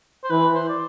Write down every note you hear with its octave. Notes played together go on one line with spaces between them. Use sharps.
C5
E3 B4
C5
D5